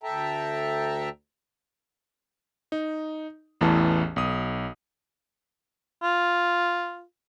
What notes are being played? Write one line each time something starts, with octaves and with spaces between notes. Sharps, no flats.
D2 A4 E5 G5 A5 A#5
D#4
A1 E2 A2 E3 A5
B1 D#6
F4